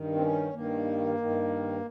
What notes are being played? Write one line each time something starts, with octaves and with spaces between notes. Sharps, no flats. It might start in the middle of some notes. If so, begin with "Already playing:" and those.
Already playing: G2 D#3
C4
C#4
G2 D#3 A#3
G2 D#3